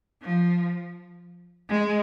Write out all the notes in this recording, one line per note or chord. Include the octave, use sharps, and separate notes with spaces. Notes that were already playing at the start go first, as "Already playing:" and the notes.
F3
G#3